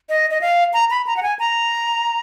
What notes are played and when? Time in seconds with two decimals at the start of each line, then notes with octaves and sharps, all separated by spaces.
0.09 D#5
0.30 D#5
0.41 F5
0.73 A#5
0.90 B5
1.07 A#5
1.17 F#5
1.23 G#5
1.39 A#5